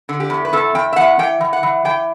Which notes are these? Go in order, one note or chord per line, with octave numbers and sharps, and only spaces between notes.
D3
G4
E2
B4
E2 A4
E2 G5
E5
E2 F#5
E3 G5
E3
F#5
E3
E3 G5